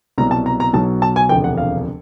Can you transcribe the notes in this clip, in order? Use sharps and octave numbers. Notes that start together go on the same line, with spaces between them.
C2 B2 F#3 A#5
A5
A#5
A#5
B1 B2 F#3 A5
A5
G#5
E1 D2 C3 F3 G5
F#5
F5